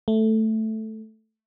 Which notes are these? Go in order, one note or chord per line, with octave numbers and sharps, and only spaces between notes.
A3